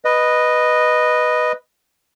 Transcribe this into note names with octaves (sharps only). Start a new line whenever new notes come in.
B4 D#5